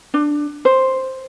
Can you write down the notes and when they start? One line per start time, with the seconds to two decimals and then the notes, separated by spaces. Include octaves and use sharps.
0.14 D4
0.65 C5